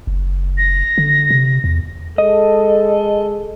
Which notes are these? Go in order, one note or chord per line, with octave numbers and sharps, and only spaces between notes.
F#1
A#6
D3
C3
E2
G#3 A4 D#5